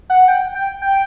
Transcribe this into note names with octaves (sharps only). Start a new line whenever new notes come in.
F#5
G5
G5
G5